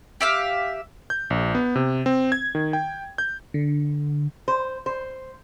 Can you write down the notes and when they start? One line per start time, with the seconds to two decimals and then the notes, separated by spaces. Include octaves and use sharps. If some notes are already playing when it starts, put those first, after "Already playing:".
0.21 G4 E5 F5
1.10 G6
1.30 A#1
1.55 B3
1.76 C3
2.06 C4
2.32 G#6
2.55 D#3
2.73 G5
3.18 G6
3.54 D3
4.48 C5
4.86 C5